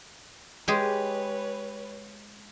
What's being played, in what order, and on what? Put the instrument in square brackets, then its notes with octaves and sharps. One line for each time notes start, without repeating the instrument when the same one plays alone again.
[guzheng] G#3 G4 G#4 [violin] B4 C#5